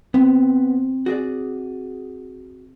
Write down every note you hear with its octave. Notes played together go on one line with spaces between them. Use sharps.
B3 C4
F#4 G#4 D5